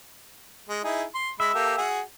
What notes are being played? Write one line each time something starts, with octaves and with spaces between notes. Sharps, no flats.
G#3
D#4 E4 G#4
C6
G#3 E5 B5
A#3 G4 A4
F#4 G#4